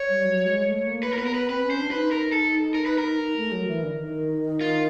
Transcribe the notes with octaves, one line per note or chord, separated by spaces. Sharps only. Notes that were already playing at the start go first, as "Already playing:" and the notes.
Already playing: C#5
G3
F#3
G#3
A3
A#3
B4
A#4
B3 B4
A#4
B4
C4 B4
C#4
C5
D4
D#4 B4
A#4
A4
A#4
B4
A#4
A3
F#3
E3
D3
D#3
F4